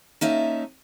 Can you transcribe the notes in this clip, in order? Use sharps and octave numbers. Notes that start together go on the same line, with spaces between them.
A#3 C#4 D#4 A4 E5